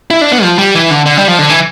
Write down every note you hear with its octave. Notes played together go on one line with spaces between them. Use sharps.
E4
D4
B3
F3
G3
E3
D3
D3
G3
F3
D3
E3